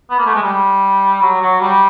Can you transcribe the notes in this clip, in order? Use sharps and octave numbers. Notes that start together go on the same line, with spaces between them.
B3
A#3
A3
G#3
G3
F#3
F#3
G3